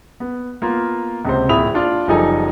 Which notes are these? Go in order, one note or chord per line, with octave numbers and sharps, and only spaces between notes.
B3
A#3 B3 F4
C#2 C3 C5
D1 A#2 E4 B5 D#6 F7
D4 F4 D5
F#1 F3 G3 D#4 A4 G#5